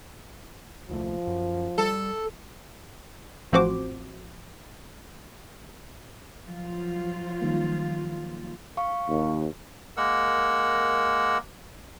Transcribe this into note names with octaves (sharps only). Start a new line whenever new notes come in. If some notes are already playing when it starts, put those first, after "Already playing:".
D#1 C2 F3 A3
F#2
G3 A4
A1 F3 C4 F#4 C5 D6
F3 F#3 F4
D#3 G3 A#3
F5 C#6
D#2
G#3 A#3 A#4 F#5 E6